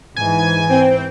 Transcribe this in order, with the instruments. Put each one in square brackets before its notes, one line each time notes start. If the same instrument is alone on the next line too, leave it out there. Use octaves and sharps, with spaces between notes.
[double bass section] G#2 E3 [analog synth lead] G#5
[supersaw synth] C4 G5 [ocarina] C5